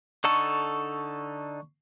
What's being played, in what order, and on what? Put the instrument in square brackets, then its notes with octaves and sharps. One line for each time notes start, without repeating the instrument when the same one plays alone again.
[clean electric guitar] D3 D#4 A4 [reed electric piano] C#6